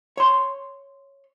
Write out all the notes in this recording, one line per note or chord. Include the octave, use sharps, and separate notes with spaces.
C#5 C6